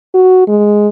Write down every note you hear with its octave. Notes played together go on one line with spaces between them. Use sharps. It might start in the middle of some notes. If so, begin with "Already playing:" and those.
F#4
G#3